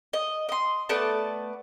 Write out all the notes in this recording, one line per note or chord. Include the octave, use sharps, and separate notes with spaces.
D#5
D#5 C6
A3 B3 D5 A5